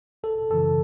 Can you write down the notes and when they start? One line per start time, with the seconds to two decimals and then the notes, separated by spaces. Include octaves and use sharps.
0.23 G1 A4
0.50 F#2 C#3 E3 A4